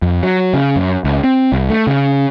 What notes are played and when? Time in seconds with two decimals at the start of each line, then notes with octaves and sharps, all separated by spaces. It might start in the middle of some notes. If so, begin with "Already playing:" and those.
0.02 F2
0.23 F#3
0.54 C#3
0.76 F#2
1.04 C#2
1.24 C4
1.52 C2
1.70 A3
1.87 C#3